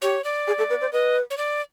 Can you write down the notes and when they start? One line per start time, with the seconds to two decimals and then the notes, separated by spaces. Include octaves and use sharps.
0.02 G4 C#5
0.24 D5
0.47 G#4
0.58 A4
0.70 B4
0.81 C5
0.93 B4 D#5
1.30 C#5
1.37 D5